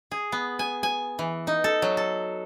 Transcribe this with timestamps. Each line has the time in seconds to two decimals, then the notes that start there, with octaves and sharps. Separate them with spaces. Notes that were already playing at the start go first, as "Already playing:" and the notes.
0.11 G#4
0.32 B3
0.59 G#5
0.83 G#5
1.19 E3
1.47 D#4
1.64 A4
1.82 F#3
1.97 A4